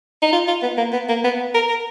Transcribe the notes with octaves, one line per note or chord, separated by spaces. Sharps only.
D#4
F4
F4
B3
A#3
B3
A#3
B3
A#4
A#4